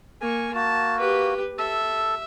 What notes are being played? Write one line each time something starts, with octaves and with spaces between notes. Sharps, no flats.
A#3 G#5 C#6
A#3 F#4 A5
G4 B4
A4 E5